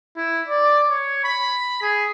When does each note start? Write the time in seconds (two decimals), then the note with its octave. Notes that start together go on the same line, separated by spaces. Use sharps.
0.17 E4
0.47 D5
0.89 C#5
1.24 B5
1.82 G#4